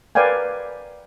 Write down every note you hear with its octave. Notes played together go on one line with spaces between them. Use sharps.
A#4 B4 D5 F5 G5 G#5